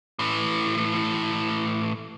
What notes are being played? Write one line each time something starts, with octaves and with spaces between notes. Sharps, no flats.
A2 E3